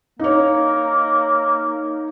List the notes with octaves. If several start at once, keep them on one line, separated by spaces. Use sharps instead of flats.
A#3 D#4 C#5